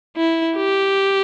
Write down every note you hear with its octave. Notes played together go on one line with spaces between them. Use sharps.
E4
G4